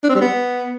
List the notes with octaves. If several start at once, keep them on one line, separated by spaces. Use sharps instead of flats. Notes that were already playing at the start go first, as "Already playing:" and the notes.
D4
C4
G3
B3